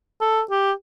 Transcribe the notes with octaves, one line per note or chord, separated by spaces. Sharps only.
A4
G4